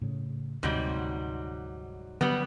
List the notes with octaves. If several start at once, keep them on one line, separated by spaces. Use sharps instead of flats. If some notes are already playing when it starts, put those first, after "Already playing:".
A2 C#3
D2 G#2 C3 F#3 G3
D3 F#3 G3 B3